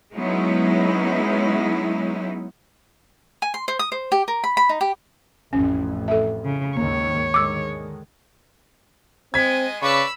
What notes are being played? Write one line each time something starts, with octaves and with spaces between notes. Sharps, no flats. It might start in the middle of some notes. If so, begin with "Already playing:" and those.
F#3 G#3 B3 C#4 D#4 E4
G#5
C6
C5
D#6
C5
G4
A#4
B5
B5
D#4
G4
A1 F2 C#4
A4 E5
C#3
D#2 G#2 D#3 A#3 C#5
D3 D#3 G#3 D6 E6
G#3 C4 D#5 G#6 B6
C#3 B4 D5 B5 C#6 E6